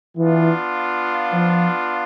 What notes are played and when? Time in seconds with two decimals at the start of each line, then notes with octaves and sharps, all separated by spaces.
0.16 E3 B3 D4 F4
1.33 F3